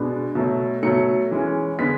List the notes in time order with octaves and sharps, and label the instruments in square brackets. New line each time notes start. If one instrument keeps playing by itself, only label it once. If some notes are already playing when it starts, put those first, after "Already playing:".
Already playing: [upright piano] B2 G#3 B3 D4
B2 F#3 A3
B2 F#3 A3 C#7
E3 G#3 C#4
D3 G#3 B3 B6